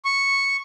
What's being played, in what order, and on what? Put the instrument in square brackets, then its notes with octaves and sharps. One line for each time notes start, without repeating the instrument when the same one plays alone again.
[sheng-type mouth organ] C#6